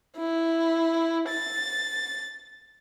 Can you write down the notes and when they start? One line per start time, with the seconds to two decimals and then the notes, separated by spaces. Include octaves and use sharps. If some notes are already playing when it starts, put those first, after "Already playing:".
0.17 E4
1.29 A6